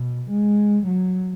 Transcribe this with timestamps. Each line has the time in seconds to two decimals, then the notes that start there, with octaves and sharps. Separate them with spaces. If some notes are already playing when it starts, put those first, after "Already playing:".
Already playing: B2
0.31 G#3
0.87 F#3